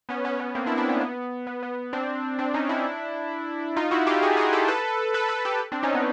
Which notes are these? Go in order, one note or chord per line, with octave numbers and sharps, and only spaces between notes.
B3 C#4
B3 C#4
B3 C#4
A#3 C4
D4 E4
D4 E4
B3 C#4
B3
B3
B3
C4 D4
C4 D4
C#4 D#4
D4 E4
D#4 F4
E4 F#4
F4 G4
F#4 G#4
F#4 G#4
G4 A4
A4 B4
A4 B4
A4 B4
G4 A4
C4 D4
C#4 D#4
B3 C#4